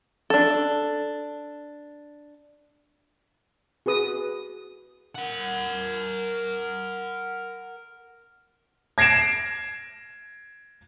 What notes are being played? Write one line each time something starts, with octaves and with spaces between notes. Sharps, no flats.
D4 A4
F#4 G#4 B4 D#6
A#4 F#5
G#6 A#6 C7 D7 E7